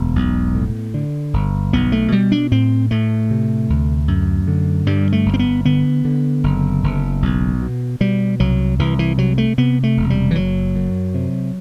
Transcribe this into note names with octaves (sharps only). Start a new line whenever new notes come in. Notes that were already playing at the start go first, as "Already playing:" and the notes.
Already playing: E1 D2 B3
B1
A2
D3
G1
B1 B3
A3
B2 G3
D4
A2 C4
A2 A3
C3
D2
F#2
D3
G2 G3
A3
G1
C4
B3
D3 B3
D3
F#1
F#1
B1
B2
B2 G3
C2 F#3
C2 E3
E3
C3 F#3
A3
C3 B3
A3
E1
G3
E3
F#1 F#3
F#2
C3